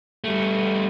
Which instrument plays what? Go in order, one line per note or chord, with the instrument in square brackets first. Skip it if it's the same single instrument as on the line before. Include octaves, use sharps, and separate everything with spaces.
[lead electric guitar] G3 A3